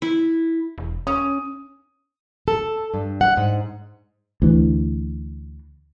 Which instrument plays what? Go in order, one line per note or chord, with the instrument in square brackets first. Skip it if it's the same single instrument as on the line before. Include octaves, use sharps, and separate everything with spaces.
[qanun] E4
[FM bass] E1
[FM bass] C#4 [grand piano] D#6
[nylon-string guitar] A4
G2
F#5
G#2
[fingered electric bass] D2 E3